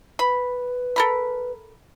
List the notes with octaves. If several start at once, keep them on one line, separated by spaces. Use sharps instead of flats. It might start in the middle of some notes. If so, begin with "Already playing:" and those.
B4 B5
A4 A#4 B5